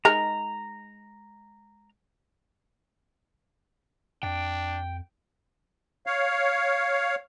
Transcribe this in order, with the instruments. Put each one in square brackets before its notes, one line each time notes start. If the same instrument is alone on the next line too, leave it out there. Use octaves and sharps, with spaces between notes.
[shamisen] G#3 D#4 A#4 [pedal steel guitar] A#5
[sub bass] F2 [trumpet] D4 [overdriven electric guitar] G5
[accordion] C#5 F5